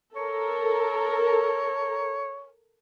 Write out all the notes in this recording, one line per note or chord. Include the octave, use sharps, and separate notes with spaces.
A4 A#4 C#5